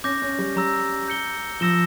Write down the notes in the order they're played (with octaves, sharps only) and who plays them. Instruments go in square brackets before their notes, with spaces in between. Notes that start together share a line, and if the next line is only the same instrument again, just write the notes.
[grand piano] C#4 [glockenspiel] D6 G6 A#6
[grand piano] C#4
G3
[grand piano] G3 [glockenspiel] A#5 E6 A#6
[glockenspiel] G6 C#7 G7
[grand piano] F3 [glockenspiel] E6 A#6 E7 G7